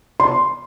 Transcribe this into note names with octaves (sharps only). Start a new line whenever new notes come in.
C6